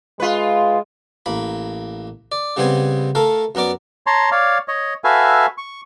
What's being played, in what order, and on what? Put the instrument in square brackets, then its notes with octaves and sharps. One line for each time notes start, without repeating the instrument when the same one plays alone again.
[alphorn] G#3 [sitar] F4 B4
[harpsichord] A1 A#3 B5
D5
C#3 G3 B3 C4 C5 G#5
A3 A4 A#4 F5
F#2 B3 A#4 D5 D6
[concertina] C#5 A5 A#5 C6
C#5 D5 F5
C#5 D#5
F#4 A4 B4 E5 F5 G#5
C#6